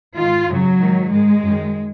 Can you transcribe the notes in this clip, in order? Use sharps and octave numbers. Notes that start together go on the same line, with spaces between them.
G#2 D#3 F4
F#2 C#3 F#3
G#2 D#3
G#2 D#3 G#3
F#2 D#3